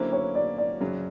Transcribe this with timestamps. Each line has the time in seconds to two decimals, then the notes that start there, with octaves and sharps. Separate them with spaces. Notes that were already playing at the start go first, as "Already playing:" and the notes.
Already playing: D3 F#3 A#3 C#4 E4 C5
0.13 C#5
0.35 D5
0.58 D5
0.80 F#2 C#3 F#3